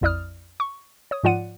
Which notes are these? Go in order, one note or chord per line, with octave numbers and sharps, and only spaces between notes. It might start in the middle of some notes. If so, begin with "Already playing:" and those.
A#1 F2 E4 D5 D#6 F6
C#6
C#5 D#6
G#2 F3 F4 D5 F#5 D#7